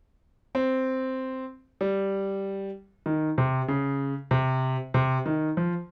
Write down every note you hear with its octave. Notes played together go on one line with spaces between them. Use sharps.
C4
G3
D#3
C3
C#3
C3
C3
D#3
F3